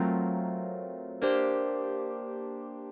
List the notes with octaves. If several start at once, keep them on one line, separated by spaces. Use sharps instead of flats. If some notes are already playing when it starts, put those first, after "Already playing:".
Already playing: F#3 A3 C4 F4 A#4
A#3 D4 G4 C5